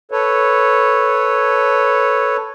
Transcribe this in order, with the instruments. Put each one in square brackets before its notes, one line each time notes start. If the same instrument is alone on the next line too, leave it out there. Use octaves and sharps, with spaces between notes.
[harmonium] A4 B4 C#5